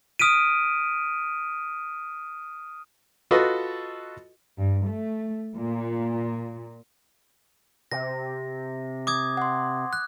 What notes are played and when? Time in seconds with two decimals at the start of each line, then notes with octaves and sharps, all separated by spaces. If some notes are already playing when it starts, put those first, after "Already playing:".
0.19 D#6 F6 B6 D7 D#7
3.31 F4 F#4 A4 B4 D#5
4.58 G2
4.88 A3
5.55 A#2
7.92 C3 A#6
9.07 D6 D#6 G#6
9.37 F#5 C6
9.93 F#6